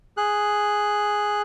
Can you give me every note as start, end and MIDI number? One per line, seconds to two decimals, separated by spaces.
0.17 1.42 68
0.17 1.42 90